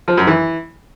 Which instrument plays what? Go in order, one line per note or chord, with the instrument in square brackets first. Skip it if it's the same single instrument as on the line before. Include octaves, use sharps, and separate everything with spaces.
[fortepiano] F3
F#2
E3